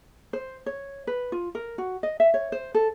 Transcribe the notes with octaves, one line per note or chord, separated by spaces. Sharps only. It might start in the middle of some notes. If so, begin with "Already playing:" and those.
C5
C#5
B4
F4
A#4
F#4
D#5
E5
C#5
C5
A4